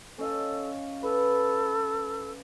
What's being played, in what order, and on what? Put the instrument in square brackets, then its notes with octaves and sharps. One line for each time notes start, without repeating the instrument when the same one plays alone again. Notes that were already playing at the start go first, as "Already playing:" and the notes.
[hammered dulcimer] C#4 D#5 F5 [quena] A4
[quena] A4 [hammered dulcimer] B4